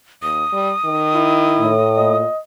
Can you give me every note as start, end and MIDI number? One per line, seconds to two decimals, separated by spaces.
0.22 0.44 39
0.22 2.16 87
0.53 0.72 55
0.85 1.72 51
1.15 1.78 64
1.59 2.22 45
1.96 2.26 46
1.96 2.40 75